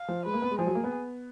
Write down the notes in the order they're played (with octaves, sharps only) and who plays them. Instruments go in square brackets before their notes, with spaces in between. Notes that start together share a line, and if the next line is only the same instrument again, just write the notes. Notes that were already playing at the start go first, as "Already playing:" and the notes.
Already playing: [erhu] F5
[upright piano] F3
[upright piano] G#3 [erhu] B4
[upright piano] A#3
B3
G#3
[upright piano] F3 [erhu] G#4
[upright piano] F#3
A#3
B3